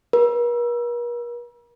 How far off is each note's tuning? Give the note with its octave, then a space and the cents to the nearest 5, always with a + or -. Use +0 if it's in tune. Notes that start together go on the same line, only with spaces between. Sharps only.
A#4 +45